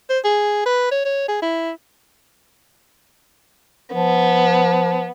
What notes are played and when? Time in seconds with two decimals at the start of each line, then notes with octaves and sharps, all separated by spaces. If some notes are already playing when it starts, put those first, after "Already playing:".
0.10 C5
0.25 G#4
0.66 B4
0.91 C#5
1.05 C#5
1.28 G#4
1.42 E4
3.94 F3 B3